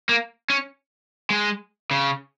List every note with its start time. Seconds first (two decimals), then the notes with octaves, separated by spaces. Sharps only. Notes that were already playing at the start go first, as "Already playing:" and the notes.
0.09 A#3
0.50 C#4
1.30 G#3
1.91 C#3